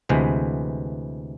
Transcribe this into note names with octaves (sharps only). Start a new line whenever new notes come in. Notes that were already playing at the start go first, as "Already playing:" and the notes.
D2 C3 E3 G#3 B3